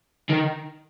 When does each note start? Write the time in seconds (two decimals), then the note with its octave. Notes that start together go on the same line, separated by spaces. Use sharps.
0.29 D#3